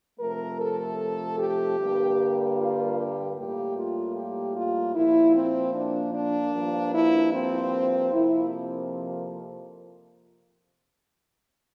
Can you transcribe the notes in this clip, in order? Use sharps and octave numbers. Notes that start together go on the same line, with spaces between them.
C3 F3 A3 A#4
A4
G4
G2 D3 G3 A#3
F4
G4
A2 G3 A#3 G4
F4
G4
F4
A#2 F3 A#3 E4
C4
D4
D4
G2 F3 A#3
E4
C4
F2 C3 F3 A#3 E4